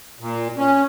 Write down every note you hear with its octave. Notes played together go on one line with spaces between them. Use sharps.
A#2
C#4